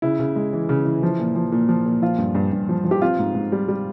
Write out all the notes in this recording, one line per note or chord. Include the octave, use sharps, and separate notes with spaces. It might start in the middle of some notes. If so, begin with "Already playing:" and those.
C#3 E4
C#3
G#3
E3
C#3
E3
F3
A#2
F3
A#2
F3
A#2
F3 F4
G2
G2
G2
F3
F3
G4
C4 F4
G#2
G#2
G3
G3